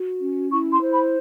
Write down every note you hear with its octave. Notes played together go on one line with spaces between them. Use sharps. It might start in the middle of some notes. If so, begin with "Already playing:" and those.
Already playing: F#4
C#4
E4 C#6
C6
C5
B5